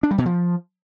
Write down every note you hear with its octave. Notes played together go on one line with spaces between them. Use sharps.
D4
G3
B2
F3